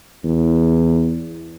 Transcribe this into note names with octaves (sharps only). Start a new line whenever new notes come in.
E2